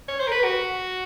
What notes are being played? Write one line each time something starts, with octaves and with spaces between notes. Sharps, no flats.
C#5
C5
A#4
B4
F#4